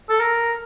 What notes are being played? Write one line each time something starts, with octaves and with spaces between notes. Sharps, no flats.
A4
A#4